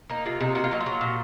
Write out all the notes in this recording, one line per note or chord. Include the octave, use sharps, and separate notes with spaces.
A#3 D#4
C3 F4
C3 D#4
A#3 F#4
F4
F#3 D#4
F4
F#3
A#2